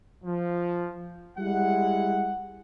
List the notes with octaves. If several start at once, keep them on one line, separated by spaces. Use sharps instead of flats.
F3
G3 G#3 E4 F#5